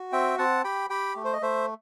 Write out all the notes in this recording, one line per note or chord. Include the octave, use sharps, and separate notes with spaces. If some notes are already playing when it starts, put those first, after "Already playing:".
Already playing: F#4
C4 E5 G5
C4 F#5 A5
G4 G5 B5
G4 G5 B5
A3
C5
D#5
A3 C5 E5